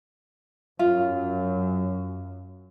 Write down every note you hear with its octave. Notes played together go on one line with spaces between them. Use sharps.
F#2 F4